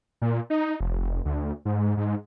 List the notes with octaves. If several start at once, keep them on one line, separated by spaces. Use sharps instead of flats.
A#2
D#4
F1
D2
G#2
G#2